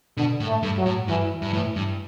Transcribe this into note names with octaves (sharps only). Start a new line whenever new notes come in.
B2 D3
A2
A3
G2
F#3
A2
G2 E3
G2
A2 E3
G2